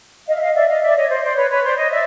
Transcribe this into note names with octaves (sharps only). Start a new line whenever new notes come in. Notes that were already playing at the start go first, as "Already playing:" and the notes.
D#5 F5
E5
D#5 F5
D5 E5
D#5 F5
D5 E5
C#5 D#5
C5 D5
C5 D5
B4 C#5
B4 C#5
C5 D5
C#5 D#5
D5 E5